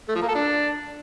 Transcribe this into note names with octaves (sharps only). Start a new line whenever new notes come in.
A3
F3
A#3
A4
D4